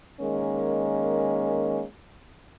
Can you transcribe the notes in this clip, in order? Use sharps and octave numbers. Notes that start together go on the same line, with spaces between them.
D#3 G#3 A#3 C#4